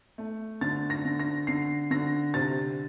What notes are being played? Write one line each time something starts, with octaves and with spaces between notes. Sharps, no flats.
A3
D3 A6
A#6
D3
A#6
D3 C7
D3 A#6
C3 A6